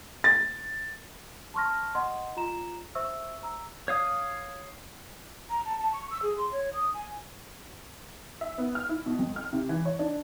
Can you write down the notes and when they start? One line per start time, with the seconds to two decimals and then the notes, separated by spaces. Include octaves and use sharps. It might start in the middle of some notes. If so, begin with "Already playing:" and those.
0.24 A6
1.54 A5 C6 C#6 F6 A#6
1.95 D#5 F#5 C6
2.37 F4 A#5 E7
2.95 C5 E5 C#6 E6
3.43 A#5 E6
3.88 C#5 F5 D#6
5.50 A#5
5.65 A5
5.79 A5
5.93 C#6
6.11 E6
6.23 G#4
6.38 C6
6.52 C#5
6.73 D#6
6.94 G#5
8.41 E5
8.58 B3
8.75 F6
8.89 E4
9.06 B2
9.19 F2
9.36 F6
9.53 C3
9.69 E3
9.85 C#5
9.99 D4